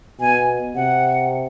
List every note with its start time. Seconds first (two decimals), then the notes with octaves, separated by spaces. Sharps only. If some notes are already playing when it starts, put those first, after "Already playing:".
0.20 B2 G#5
0.76 C3 F#5